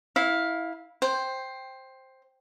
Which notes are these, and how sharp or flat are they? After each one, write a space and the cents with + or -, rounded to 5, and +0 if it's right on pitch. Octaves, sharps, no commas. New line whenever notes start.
E4 -10 F5 +15
C5 +10 G5 +0